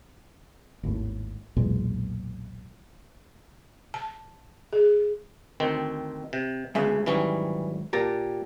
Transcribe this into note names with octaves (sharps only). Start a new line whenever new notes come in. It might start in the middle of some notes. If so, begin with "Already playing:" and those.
G#1 D#2 A2
B1 E2 A#2 G#3
A5
G#4
D2 D#3 C4
C3
D2 C#3 G#3 B3 E5
G#2 D#3 E3 F#3 G3 C#4
A#2 G4 A5 A#5